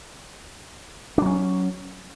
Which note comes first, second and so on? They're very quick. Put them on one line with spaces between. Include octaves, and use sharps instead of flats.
D4 F#3 C#4